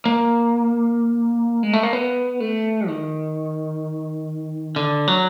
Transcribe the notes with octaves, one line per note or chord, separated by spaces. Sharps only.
A#3
G#3
A3
A#3
B3
A3
D#3
D3
F#3